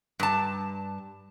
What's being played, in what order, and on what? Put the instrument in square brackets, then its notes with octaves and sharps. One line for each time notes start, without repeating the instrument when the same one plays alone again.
[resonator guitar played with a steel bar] G2 A5